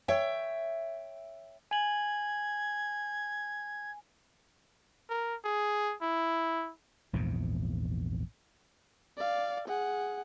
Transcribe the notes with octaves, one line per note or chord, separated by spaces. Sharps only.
C#5 E5 G5
G#5 G#6 F#7
A#4
G#4
E4
A#1 E2 G#2 C3
D5 F5
G#4 F#5